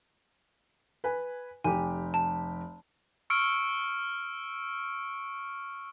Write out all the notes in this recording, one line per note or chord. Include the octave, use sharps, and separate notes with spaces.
B4 G#5
F1 G4 G#5
A5
C#6 E6 F6 C#7 D7